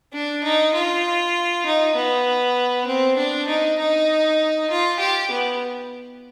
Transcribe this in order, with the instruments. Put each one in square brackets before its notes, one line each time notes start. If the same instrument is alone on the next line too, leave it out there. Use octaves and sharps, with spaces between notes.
[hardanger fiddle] D4
D#4
F4
D#4
B3
C4
D4
D#4
D#4
F4
G4
B3